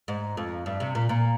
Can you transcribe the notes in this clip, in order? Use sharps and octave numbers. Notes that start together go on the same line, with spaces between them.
G#2
F2
G2
C3
A#2
A#2